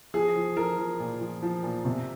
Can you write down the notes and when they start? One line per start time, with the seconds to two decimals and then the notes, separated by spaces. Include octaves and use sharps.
0.14 F3 G#4
0.36 F3
0.57 F3 A#4
0.78 F3
0.99 A#2
1.21 F3
1.42 F3
1.63 A#2
1.85 C3